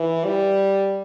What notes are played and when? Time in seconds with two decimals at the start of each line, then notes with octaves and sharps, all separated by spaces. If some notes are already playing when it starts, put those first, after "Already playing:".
Already playing: E3
0.25 G3